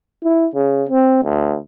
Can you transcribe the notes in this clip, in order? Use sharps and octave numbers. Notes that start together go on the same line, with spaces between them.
E4
C#3
C4
D2